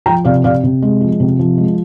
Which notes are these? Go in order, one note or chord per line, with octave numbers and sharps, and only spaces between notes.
F3 G5 A#5
C3 D5 F5
C3 D5 F5
C3
G#3
F3
C3
F3
G#3